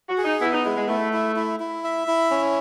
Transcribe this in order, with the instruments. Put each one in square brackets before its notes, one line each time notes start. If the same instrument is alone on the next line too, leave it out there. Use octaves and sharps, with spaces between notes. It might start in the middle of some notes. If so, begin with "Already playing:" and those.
[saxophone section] F#4
[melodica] G#4
[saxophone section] D#4
[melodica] B3 [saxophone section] E4
[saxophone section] D#4
[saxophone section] G#3 [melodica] E4
[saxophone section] G#3
[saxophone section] A3 [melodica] E4
[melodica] E4
E4
E4
E5
E4
C#4